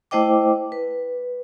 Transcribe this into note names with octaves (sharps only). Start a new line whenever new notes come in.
A3 E4 C5 D#5 G5 D6
B4